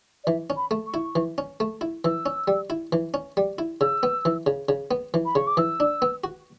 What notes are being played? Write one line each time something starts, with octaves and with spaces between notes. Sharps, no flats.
D5
E3 E5
C#4
B5
A3
C#6
E4
E3
C#4
A3
E4
E3 E6
C#4
G3
E4
E3
C#4
G3
E4
C#3 E6
B3
E3
C#3
C#3
B3
E3
B5
C#3 C#6
D6
E3 E6
D4
B3
F#4